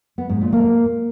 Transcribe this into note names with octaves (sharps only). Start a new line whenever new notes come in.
B3
G#2
A#2
A#3